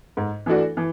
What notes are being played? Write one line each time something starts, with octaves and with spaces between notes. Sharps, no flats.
G#2
E3 A3 D4 F#4
E3